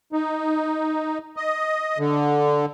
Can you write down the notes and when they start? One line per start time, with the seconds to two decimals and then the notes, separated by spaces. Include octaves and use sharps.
0.13 D#4
1.37 D#5
1.98 D3